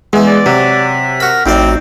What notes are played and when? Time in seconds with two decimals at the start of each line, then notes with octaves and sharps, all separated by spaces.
0.13 E2 E3 G#3
0.28 D5
0.46 C3 F#3 B6
1.20 F#4 A#4 B5
1.46 A1 F2 A2 C4 D#4 F#4 D5